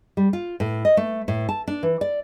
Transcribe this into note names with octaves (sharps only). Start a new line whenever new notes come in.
G3
F4
A2
D#5
A3
A2
A5
D4
E3
D5